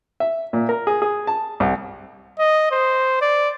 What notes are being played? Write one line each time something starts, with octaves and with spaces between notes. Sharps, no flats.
E5
A#2
A#4
G#4
G#4
A5
C2
D#5
C5
D5